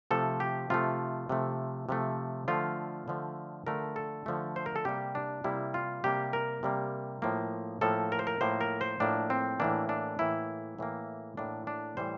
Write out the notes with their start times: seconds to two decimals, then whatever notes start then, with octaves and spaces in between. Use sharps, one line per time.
0.11 C3 F3 A3 A4
0.40 G4
0.70 C3 F3 A3 F4
1.29 C3 F3 A3
1.89 C3 F3 A3
2.48 D3 F3 A3 F4
3.08 D3 F3 A3
3.67 D3 F3 A3 A#4
3.96 A4
4.26 D3 F3 A3
4.56 C5
4.66 A#4
4.76 A4
4.85 C3 G3 A#3 G4
5.15 D4
5.44 C3 G3 A#3 E4
5.74 F4
6.04 C3 G3 A#3 G4
6.33 A#4
6.63 C3 G3 A#3
7.22 A2 F3 A#3
7.81 A2 F3 A#3 A4
8.12 A#4
8.19 C5
8.27 A#4
8.41 A2 F3 A#3 C5
8.61 A#4
8.81 C5
9.00 A2 F3 A#3 D4
9.30 C4
9.60 A2 E3 A#3 D4
9.89 D4
10.19 A2 E3 A#3 E4
10.78 A2 E3 A#3
11.37 A2 E3 A#3 D4
11.67 D4
11.97 A2 E3 G3 C5